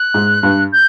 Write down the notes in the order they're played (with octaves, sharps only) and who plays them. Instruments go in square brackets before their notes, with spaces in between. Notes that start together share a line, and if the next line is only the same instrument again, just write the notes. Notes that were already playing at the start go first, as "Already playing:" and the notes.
Already playing: [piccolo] F#6
[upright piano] G#2
G2
[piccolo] G6